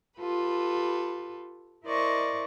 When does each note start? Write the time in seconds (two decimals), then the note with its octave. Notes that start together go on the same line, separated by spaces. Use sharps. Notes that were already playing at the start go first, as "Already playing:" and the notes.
0.19 F4 G4 A4 B4
1.83 E4 A#4 C5 D5 D#5 C#6